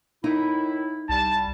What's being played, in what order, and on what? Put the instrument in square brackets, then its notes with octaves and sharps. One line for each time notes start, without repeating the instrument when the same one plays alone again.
[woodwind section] A2 D#3 E4 [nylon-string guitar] D#4
[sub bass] C2 [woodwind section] G3 [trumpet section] A5